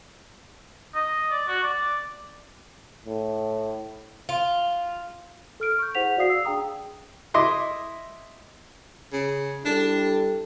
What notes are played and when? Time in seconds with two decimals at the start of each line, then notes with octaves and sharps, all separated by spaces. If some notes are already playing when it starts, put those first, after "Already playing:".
0.95 D#5
1.31 D5
1.47 F#4
1.64 D5
3.06 A2
4.29 F4
5.60 A4 F6 D7
5.79 C#6 G6
5.95 E4 G#4 C5 F#5 B6 F7
6.17 F#4 D5 F5 D#6 C7
6.29 E6 C7
6.45 D4 G#4 G5 A#5 D#6
7.34 E4 D#5 C6 D6
9.13 C#3
9.65 G3 D4 E4 A4